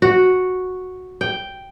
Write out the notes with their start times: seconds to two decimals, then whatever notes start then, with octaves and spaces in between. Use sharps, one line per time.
0.02 F#4
1.21 G5